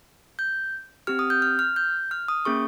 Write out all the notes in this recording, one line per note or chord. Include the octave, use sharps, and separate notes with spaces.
G6
C4 G4 F6
D#6
G6
F6
F6
G6
F6
D#6
A#3 C#4 G#4 C#6